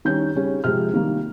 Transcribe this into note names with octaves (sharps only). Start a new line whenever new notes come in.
D#3 G3 C#4 G6
C#3 G3 C#4
C3 F3 G#3 F6
D#3 G3 A#3